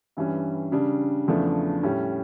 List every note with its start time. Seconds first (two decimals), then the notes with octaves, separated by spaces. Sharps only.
0.17 G2 E3 G3 C#4
0.72 C#3 G3 D4
1.28 E2 C#3 F3 A3 D4
1.83 A2 G3 C#4